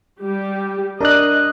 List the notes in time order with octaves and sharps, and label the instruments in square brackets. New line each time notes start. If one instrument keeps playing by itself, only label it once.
[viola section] G3 G4
[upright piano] D4 [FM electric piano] A#4 D5 F#6 [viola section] D#5